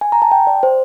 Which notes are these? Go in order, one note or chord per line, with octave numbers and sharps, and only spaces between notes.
G#5
A#5
A5
G5
D5
C5